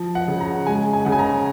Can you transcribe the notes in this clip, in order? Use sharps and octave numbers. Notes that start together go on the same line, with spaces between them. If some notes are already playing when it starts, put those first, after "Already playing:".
Already playing: F3
F#5
C#3
A#5
G#3 G#5
G#5
C#3 F#5
G#5
A#5